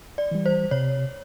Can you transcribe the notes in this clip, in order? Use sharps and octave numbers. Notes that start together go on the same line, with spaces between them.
D5
E3 G3
C5
C3 C#5